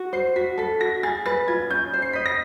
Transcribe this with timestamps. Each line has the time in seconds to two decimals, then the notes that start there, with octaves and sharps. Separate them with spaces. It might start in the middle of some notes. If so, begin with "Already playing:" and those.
Already playing: F#4
0.13 C5 C7
0.36 F#4 B6
0.58 A4 B6
0.80 F#4 A#6
1.03 G#4 A6
1.26 B4 A6
1.48 F4 G#6
1.70 C#4 G6
1.93 C5
2.02 C7
2.13 D#5 B6
2.26 A#6